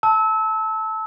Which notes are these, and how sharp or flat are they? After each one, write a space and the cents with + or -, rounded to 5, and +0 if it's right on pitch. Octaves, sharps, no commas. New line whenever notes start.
A5 +0 E6 -25